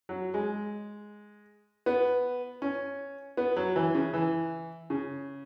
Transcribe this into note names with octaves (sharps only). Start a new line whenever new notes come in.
F#3
G#3
B3
C#4
B3
F#3
E3
C#3
E3
C#3